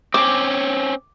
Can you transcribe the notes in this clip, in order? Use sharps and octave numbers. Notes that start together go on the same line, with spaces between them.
C4 C#4 D6